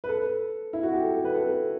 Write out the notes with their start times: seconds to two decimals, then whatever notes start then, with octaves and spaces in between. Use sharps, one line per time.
0.04 B4
0.09 A4
0.73 E4
0.83 F#4
0.93 G4
1.03 A4
1.25 B4
1.34 A4